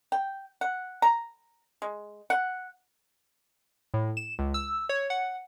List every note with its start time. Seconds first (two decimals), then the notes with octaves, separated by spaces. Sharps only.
0.12 G5
0.61 F#5
1.02 A#5
1.82 G#3
2.30 F#5
3.94 A2
4.17 E7
4.39 C#2
4.54 E6
4.89 C#5
5.10 F#5